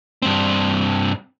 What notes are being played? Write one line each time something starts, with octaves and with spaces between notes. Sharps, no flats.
G2 C4